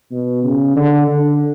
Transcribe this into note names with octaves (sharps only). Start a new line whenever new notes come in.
B2
C#3
D3
D3